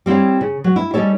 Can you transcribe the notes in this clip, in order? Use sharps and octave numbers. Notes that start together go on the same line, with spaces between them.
G3 C4 E4 C#5 F5
C#3
F#3
E4
G3 C#4 D#4 A4 C#5